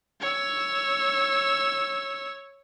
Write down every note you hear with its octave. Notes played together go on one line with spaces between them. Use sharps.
C#5 E6